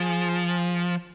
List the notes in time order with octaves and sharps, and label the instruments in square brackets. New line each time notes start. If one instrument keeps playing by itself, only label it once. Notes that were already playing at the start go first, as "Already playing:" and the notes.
Already playing: [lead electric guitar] F3 [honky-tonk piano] G#4